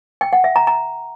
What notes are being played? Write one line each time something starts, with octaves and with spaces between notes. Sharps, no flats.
G5
F#5
E5
A#5
A#5